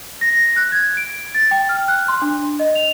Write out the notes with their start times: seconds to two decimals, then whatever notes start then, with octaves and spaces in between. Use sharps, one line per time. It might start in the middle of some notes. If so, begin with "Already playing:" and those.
0.21 A#6
0.56 F#6
0.72 G#6
0.97 D7
1.34 A6
1.51 G5
1.69 F6
1.88 F#6
2.08 C6
2.22 D4
2.59 D#5
2.75 F7